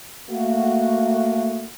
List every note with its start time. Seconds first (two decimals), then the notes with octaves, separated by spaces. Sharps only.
0.29 A3 A#3 F#4